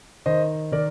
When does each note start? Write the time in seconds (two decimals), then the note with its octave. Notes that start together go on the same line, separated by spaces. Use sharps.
0.26 D#3 C5 D#5
0.72 D#3 A#4 D5